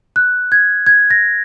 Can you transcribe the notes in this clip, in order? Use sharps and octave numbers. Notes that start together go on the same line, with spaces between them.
F#6
G#6
G#6
A#6